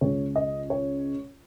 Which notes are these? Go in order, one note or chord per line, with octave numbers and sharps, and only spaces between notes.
C#2 C#3 G#3 C#4 C#5
D#5
C#5